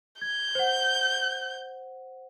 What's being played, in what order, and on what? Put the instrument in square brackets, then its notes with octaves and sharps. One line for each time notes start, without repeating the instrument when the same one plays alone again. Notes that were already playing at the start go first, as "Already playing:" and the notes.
[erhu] G6 [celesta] G#6
[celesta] C5 F#5